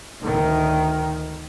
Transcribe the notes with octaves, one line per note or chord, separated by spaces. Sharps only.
D2 D#3